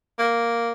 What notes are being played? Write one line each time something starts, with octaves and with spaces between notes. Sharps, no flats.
A#3